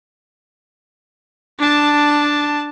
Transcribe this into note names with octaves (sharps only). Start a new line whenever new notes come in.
D4 A5